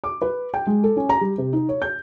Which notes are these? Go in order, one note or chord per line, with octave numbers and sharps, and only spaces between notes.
D6
B4
G5
G#3
A4
C#4
A#5
G3
C3
D#4
C#5
G6